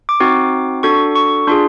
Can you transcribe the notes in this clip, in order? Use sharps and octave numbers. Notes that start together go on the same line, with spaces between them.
D6
C4 D#4 F#4
D4 F#4 A4 C#6
C#6
D4 F4 G#4 C6